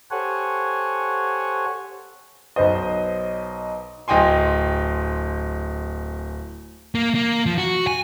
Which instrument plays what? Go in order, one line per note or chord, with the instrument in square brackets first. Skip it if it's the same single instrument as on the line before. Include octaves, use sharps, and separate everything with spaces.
[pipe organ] G4 A4 C5 C#5 F#5 G#5
[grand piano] B1 B4 C5 D#5
D1 D#5 G5 G#5 C6
[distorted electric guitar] A#3
A#3
F3
F#4
G#5